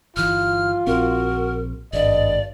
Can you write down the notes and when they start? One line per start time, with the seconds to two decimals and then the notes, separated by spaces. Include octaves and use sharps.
0.17 G1 E3 F4 F6
0.87 A#1 C4 F#4 A#4
1.93 G#1 G2 D5 D#5